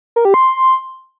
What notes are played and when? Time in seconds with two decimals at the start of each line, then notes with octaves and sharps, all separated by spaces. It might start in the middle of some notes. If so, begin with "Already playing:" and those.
0.16 A#4
0.25 G4
0.34 C6